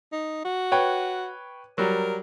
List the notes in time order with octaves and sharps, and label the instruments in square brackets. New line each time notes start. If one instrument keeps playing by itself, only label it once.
[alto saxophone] D#4
F#4
[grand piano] B4 C#5 G5
[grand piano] F#3 G3 [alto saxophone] A#4